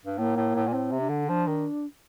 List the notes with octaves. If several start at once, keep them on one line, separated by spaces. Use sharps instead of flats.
G2
A2 A#3
A2
A2
A#2
A2 C4
C3
D4
D3
F3 D4
D#3